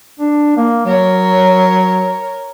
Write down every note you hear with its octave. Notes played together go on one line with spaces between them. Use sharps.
D4
A#3
F#3 A#4 C#5